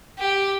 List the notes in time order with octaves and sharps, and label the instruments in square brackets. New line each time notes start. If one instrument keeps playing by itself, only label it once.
[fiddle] G4